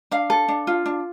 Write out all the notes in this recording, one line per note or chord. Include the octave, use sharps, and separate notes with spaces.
D4 F5
A4
D4
F4
D4